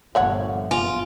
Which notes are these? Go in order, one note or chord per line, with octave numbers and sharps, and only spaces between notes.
G1 A#2 F3 A3 C#5 F#5
F#1 B3 F4 G#5